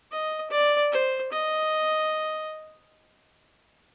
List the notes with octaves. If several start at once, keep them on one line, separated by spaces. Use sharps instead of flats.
D#5
D5
C5
D#5